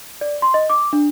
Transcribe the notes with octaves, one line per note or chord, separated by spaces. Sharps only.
D5
C6
D#5
D6
D4